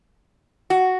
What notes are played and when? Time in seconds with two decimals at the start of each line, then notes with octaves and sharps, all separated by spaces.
0.70 F#4